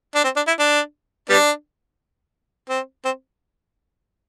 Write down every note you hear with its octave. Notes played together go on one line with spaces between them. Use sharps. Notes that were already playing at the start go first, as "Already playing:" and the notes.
D4
C4
D4
E4
D4
G3 B3 D4
C4
C4